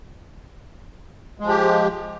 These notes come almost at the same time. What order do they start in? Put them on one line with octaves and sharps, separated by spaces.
G#3 F3 G4